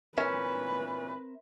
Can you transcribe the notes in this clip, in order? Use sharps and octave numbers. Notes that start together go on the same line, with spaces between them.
A#2 E3 C4 C#4 A#4 B4 E5